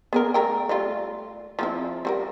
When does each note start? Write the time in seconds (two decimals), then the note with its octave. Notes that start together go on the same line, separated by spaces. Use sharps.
0.13 B3 G#4 A#4
0.34 A3 A#4 G5
0.69 G3 A3 F4
1.59 F3 C4 E4
2.05 G3 F#4 A#4